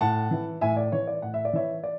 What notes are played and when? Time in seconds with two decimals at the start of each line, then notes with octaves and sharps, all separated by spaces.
0.01 A2 F#5 A5
0.31 E3
0.61 A2 E5 G#5
0.77 D5
0.92 E3 C#5
1.07 D5
1.22 A2 F#5
1.34 E5
1.45 D5
1.53 E3 C#5 E5
1.83 D5